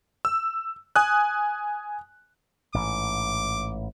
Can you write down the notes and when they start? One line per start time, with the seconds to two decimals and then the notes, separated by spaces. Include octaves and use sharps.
0.25 E6
0.96 G#5 D#6 F#6
2.74 A1 G#2 D6